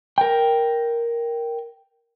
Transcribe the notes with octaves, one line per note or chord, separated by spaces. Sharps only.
A#4 G5